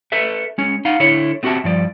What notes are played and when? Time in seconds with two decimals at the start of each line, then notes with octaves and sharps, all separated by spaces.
0.12 A4 B4 E5
0.58 G#3 C#4
0.85 D#4 F5 F#5
1.00 D3 E4 A4 C#5
1.43 A3 C4 F#4 G4 E5 A5
1.64 G2 F3 D5